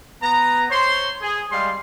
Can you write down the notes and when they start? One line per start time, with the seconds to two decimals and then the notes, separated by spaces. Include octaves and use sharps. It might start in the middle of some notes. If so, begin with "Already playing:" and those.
0.23 B3 A#5
0.70 C5 C#5 C6
1.21 G#4
1.52 G3 G#3 F5 C6